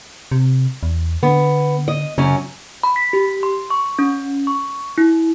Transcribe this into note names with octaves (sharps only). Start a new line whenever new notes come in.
C3
E2
D3 B3
D#5
F#2 C#3 C#4
B5
B6
G4
C6
C#6
C#4
C#6
E4